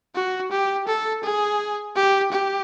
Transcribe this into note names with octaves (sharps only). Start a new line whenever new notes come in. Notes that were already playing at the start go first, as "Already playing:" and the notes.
F#4
G4
A4
G#4
G4
G4